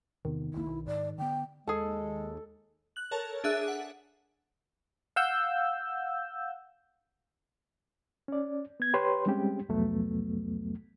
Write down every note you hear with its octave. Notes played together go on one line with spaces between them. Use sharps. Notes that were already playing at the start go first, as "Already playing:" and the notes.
E2 C3 D#3 B3
F1 C#2 A#3 E4
B1
G#2 D5
D3 B3 G5
D#2 G#3 G#4 A4 A5
F#6 F#7
A4 A#4 C#5 A5
D4 G#4 E5 F#6
F#5
F5 F#5 E6 G6
C#4 D5
B3 G#6
G4 B4 C#5 C6
G3 G#3 C4 C#4 G4
C2 F2 F#3 A3 B3